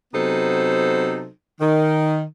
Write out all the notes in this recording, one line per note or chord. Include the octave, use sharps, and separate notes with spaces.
C3 F#3 B3 D#4 A4 C5
D#3